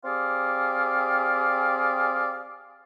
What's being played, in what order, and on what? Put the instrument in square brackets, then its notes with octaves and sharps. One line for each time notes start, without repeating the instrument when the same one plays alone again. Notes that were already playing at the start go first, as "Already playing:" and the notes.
[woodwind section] C4 G4 G#4 D5 F5